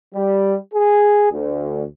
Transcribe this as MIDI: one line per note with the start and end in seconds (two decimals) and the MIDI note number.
0.14 0.54 55
0.74 1.27 68
1.31 1.82 38